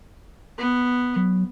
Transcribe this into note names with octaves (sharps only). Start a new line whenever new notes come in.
B3
F#3